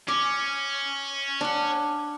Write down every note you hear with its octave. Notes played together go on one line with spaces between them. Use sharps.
C#4 D6
D4 F#5